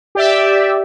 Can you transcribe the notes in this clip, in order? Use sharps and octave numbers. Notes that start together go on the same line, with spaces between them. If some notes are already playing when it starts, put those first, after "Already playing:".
G4 D5 E5